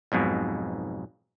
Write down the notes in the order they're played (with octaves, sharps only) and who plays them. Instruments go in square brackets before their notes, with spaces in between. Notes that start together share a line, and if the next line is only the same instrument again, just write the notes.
[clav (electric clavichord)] B1 F2 G#2 B2